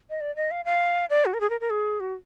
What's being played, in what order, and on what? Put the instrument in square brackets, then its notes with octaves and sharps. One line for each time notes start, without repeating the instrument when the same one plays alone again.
[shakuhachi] D#5
D5
D#5
F5
F5
D5
F#4
A#4
G#4
A#4
A#4
G#4
F#4